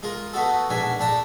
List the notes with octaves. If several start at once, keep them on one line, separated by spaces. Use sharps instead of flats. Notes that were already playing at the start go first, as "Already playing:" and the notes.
G#3 F4 A#4
A3 B3 D#4 F#4 A4
A#1 G#2 B2 D4 E5 G#5
A#1 A3 D4 G5 A5 A#5